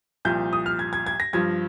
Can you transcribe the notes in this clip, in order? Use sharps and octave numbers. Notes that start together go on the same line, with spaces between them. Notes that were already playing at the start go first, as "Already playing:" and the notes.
C2 A#2 F3 G6
D#6
F6
G#6
G#6
G#6
A#6
G2 F3 G#6